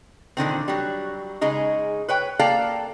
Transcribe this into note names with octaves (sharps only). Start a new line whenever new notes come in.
A#2 D3 D#3 C4
F#3 G3
C#3 G#3 D#4
B4 C#5 G5
A#3 A4 D5 F5 G5